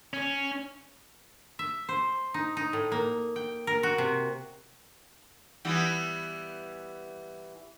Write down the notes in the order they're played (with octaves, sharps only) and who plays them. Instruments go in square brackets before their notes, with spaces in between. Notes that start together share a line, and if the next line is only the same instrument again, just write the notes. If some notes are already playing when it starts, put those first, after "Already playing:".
[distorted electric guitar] C#4
[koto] E5
C5
D#4
D#4
A2
A#3
G5
A#4
F#4
C3
[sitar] E3 G3 B3